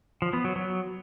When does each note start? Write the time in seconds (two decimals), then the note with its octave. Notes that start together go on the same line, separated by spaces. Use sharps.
0.22 F3
0.33 B3
0.45 F#3
0.56 F#3